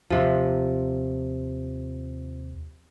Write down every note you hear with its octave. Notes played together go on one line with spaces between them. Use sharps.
D#2 C3 F3